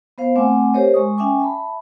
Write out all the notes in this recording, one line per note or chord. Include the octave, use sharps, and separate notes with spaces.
B3 C5 F5
A3 C4 F#5 G#5 D6
G4 A#4 C5 C#5 D#5
G#3 C#6 D#6
C#4 E5 G5 G#5 C#6 D6
E5 A5 B5